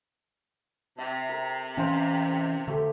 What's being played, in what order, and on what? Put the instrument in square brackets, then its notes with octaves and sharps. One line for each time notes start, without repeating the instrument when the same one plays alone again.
[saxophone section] C3 [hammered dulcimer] E5
[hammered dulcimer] A#4
[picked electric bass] E3 C#4 [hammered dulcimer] C5 F5
[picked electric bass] D3 [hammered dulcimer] A3 G4